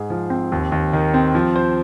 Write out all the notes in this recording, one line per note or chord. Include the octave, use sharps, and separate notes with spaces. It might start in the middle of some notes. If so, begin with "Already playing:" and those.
Already playing: G#2 G#4
F3
C4
D#2
D#2
D#3
C4
F3
C5